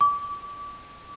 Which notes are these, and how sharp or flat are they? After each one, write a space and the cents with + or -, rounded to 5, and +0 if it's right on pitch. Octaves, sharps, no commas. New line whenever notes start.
D6 -30